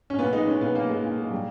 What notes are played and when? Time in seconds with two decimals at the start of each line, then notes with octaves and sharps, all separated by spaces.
0.10 C#4
0.19 A#2 B3
0.33 G#3 D#4
0.47 G#3 C#4
0.61 A#2 B3
0.75 A#2 A#3
0.89 G#3
1.03 A#2
1.18 G#3
1.31 G3